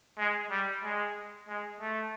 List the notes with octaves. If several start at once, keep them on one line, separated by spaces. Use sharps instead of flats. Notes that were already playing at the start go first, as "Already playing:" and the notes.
G#3
G3
G#3
G#3
A3